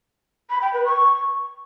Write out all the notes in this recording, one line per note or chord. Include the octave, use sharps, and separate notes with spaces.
B5
G5
B4
C#6